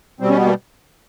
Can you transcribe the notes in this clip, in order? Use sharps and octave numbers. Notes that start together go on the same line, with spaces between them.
B2 G3 C4
C#4
B3
A#3